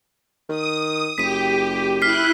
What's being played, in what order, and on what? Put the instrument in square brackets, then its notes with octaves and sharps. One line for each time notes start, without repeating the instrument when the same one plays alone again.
[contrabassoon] D#3 [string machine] D#6
[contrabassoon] F#1 [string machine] G4 [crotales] B6 D#7
[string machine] E4 F#6 [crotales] F6 B6 C7